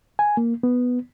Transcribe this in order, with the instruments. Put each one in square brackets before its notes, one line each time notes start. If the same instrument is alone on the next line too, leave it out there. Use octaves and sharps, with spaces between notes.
[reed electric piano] G#5
A#3
B3